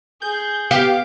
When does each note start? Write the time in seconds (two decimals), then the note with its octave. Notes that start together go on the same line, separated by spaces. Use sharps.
0.22 G#4 G6
0.71 B3 G4 F5 D6